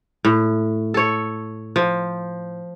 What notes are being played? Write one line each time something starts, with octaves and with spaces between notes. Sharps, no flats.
A2
A4 C#5
F3